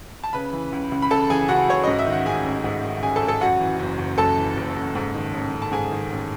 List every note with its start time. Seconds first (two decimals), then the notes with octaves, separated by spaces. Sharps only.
0.24 A5
0.33 C#3 B4 B5
0.52 E3
0.72 C#2
0.92 C#2
1.02 B5
1.10 C#3 A4 A5
1.30 E3 G#4 G#5
1.48 C#2 F#4 F#5
1.68 C#2 C#5
1.84 G#2 D#5
1.99 E5
2.07 D#3
2.13 F#5
2.26 A1 G#4 G#5
2.45 A1
2.64 G#2
2.84 D#3
3.02 A1 G#4 G#5
3.16 A4 A5
3.22 A1
3.28 A4 A5
3.41 F#2 F#4 F#5
3.60 E3
3.79 F#1
3.99 F#1
4.18 F#2 A4 A5
4.38 E3
4.57 F#1
4.76 F#1
4.95 G#2
5.14 D#3
5.33 A1
5.53 A1
5.62 A5
5.72 G#2 G#4 G#5
5.92 D#3
6.10 A1